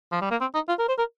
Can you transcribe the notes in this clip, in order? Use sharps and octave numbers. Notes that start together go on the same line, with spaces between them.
F3
G3
A#3
C4
D#4
F4
A#4
C5
A#4